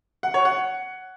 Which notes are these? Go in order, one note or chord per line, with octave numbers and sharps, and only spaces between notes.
F#5
C#5
F#5